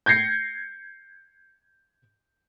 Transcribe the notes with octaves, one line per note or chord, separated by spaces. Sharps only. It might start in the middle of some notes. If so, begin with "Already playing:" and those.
G6 G#6 A#6 C7 C#7